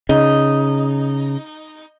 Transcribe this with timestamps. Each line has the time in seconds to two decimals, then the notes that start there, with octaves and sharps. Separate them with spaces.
0.09 C#3 D#4